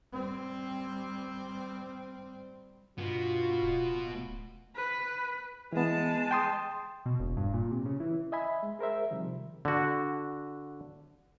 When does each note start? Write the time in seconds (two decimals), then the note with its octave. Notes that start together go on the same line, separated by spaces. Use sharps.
0.13 G3 C4
2.98 G2 B2 B3 F4
3.62 D1
4.76 B4
5.73 E3 G#3 B3 A5
6.31 G5 C6 D#6
7.06 B2
7.19 E1
7.37 G2
7.54 A#2
7.71 C3
7.86 C#3
8.00 E3
8.32 D#5 E5 G#5 B5
8.63 G#3
8.79 G#4 A#4 C5 E5
9.11 C3 D#3 F3 G3
9.65 D3 F#4